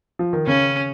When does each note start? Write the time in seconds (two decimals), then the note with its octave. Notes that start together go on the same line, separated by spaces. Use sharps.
0.19 F3
0.33 D#3
0.47 C#3 C#4